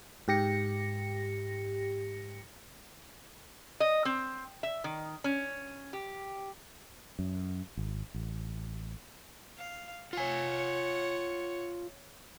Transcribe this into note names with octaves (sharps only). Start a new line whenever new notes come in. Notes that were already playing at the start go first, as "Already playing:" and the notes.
G#2 G4 A#6 C#7
D#5
C4
E5
D#3
C#4
G4
F#2
G#1
A1
F5
F4 C#5 F#5 G#5